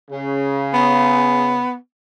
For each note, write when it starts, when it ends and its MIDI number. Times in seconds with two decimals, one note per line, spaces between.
0.10 1.62 49
0.74 1.75 59